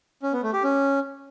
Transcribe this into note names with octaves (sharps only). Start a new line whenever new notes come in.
C#4
B3
A3
G4
C#4